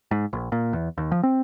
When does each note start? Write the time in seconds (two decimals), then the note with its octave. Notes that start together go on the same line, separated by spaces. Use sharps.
0.11 G#2
0.33 A#1
0.52 A#2
0.73 E2
0.97 D#2
1.12 F3
1.23 C4